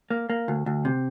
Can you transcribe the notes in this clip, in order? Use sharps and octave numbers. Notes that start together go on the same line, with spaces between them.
A#3
A#3
D2
D2
C3